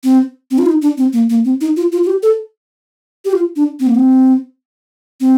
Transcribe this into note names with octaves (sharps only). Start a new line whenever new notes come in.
C4
C4
F4
D#4
D4
C4
A#3
A#3
C4
D#4
F4
F4
F4
G4
A4
G4
F4
D4
C4
A#3
C4
C4